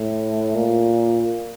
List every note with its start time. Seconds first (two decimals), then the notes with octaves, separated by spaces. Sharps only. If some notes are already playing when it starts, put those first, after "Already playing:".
Already playing: A2
0.55 A#2